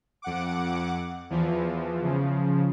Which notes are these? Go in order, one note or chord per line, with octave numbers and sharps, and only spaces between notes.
F2 F#5 D6
E2 E3 F3
C#3 F3